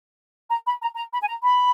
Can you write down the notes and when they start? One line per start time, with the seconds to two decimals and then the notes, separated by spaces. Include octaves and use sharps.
0.50 A#5
0.66 B5
0.81 A#5
0.96 A#5
1.12 B5
1.22 G#5
1.27 A#5
1.43 B5